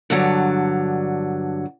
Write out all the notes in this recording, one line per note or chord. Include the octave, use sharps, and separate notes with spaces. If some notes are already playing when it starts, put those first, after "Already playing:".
G2 D3 F#3